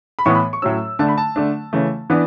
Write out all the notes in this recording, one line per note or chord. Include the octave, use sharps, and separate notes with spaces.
B5
A2 E3 B3 C#6
B5
C#6
A2 F#3 C#4 E6
D3 A3 D4 A5
B5
A5
D3 A3 D4
C#3 E3 A3
E3 B3 D4